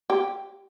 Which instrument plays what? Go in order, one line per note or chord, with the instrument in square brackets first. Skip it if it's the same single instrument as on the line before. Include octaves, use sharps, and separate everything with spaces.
[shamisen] G4